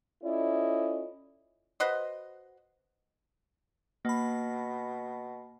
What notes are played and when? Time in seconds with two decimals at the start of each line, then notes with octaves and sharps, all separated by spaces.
0.23 C#4 E4 F4 A4 D5 D#5
1.80 F#4 B4 C5 D#5
4.05 B2 A#3 B5